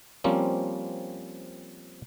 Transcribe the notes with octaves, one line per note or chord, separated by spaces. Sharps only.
F3 G3 A#3 C4 C#4